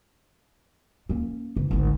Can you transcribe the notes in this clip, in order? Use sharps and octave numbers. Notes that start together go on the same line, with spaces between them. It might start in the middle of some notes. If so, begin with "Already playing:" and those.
A#3 C#4
F#1
G#1 D2